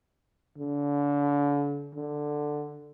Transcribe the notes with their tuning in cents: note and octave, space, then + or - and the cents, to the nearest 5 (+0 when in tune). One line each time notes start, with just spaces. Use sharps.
D3 -35
D3 +10